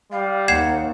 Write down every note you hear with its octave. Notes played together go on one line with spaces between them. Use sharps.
G3 F5
D#2 F#5 G#6 C7 E7